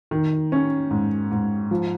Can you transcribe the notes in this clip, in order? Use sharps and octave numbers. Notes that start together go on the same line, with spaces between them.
D#3
C#4
G#2
G#2
F3